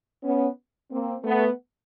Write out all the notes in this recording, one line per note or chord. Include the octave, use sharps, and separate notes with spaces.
B3 C#4
A#3 C4
A3 B3